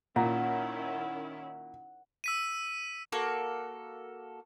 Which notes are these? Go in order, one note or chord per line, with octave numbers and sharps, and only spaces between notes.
A#2 D#3 C#4 E4 F#5
E6 B6 D#7
A#3 F#4 A4